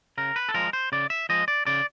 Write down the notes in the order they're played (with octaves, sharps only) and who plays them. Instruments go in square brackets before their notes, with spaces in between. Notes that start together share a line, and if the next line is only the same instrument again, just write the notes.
[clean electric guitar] C#3 A#4
B4
A4
F3 G#3 A#4
C5
C#3 D5
E5
F3 G#3 D#5
D5
C#3 D5